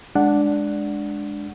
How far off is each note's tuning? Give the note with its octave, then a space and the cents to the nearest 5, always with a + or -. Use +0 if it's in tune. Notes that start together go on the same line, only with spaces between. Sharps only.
G#3 +0 D4 +0 F#5 +0